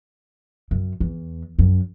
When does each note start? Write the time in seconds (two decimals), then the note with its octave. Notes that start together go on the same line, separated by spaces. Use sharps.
0.71 F#2
1.00 E2
1.59 F#2